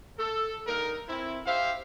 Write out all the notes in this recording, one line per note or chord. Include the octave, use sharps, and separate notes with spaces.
A4
G2 D#4 A#4
C4 E4
G4 C5 E5 F5